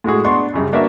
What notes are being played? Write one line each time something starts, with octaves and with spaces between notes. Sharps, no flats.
A2 G#3 F#4 G#4
B3 D4 C6 C#6
F#2 C#3 G3
A#3 D4 F#4 A#4 B4 E5